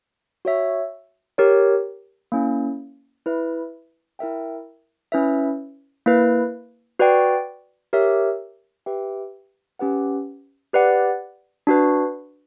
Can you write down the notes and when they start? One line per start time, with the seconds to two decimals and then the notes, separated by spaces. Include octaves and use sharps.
0.45 F#4 C#5 E5
1.38 G4 A#4 C#5
2.32 A#3 C#4 E4
3.26 E4 B4 E5
4.19 E4 A#4 E5 G5
5.12 C#4 E4 B4 E5
6.06 A#3 E4 B4
6.99 F#4 B4 D5 G5
7.93 G4 A#4 C#5 E5
8.86 G4 B4 E5 G5
9.79 C#4 G4 B4 F#5
10.73 G4 B4 D5 F#5
11.67 D4 F#4 B4